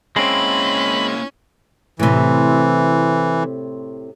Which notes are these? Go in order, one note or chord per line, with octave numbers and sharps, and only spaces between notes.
G#3 A#3 C4 C#4 E4 B5
A2 C3 E3